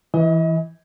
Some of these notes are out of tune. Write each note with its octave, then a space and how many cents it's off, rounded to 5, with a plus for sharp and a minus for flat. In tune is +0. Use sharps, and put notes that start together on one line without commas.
E3 +0 D#5 +40